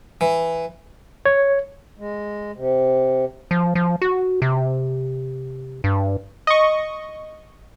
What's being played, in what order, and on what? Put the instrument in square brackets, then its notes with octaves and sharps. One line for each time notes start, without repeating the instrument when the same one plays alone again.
[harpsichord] E3
[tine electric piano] C#5
[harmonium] G#3
C3
[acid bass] F3
F3
F#4
C3
G2
[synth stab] D#5 C#6